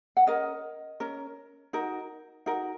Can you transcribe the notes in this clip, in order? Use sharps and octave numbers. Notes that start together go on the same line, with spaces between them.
F#5
C#4 A#4 D#5
C#4 A#4
D#4 F#4 A#4
D#4 F#4 A#4